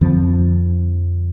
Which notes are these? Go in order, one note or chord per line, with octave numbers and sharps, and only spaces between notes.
F2 D3 F3 C4